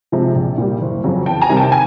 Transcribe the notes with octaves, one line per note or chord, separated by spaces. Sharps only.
C3 F3 G#3
A#1
A#2 G3
F#1
F2 C#3 F#3
E2 G5 A5
G#5 A#5
C3 D#3 G3
G5 A5
G#5